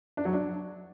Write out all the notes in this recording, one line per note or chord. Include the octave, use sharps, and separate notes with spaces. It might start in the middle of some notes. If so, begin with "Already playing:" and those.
D4
F#3
D4